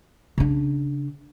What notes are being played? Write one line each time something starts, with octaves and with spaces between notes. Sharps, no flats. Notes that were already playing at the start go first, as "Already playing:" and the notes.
C#3 D4